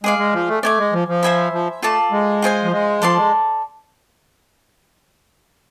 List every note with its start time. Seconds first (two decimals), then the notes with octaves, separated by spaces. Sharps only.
0.04 G#3 G#4 D5 F5
0.18 G#3
0.33 F3
0.48 A3
0.63 A3 D5 G#5 D6
0.78 G#3
0.93 F3
1.08 F3
1.23 C5 E5 G#5 B5
1.53 F3
1.82 A3 F4 A4 D5 A5
2.12 G#3
2.42 F4 G#4 C5 G#5
2.64 F3
2.72 G#3
3.02 F3 A4 D5 A5 C6
3.17 G#3